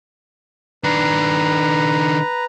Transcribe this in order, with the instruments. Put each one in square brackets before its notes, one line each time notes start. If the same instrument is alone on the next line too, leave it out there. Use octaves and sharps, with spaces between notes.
[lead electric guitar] D#3 D4 [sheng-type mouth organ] B4 A#5